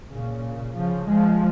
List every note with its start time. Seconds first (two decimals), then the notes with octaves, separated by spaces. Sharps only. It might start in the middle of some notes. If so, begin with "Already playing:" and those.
0.10 A#2 C#3
0.76 C#3 F3
1.09 F3 G#3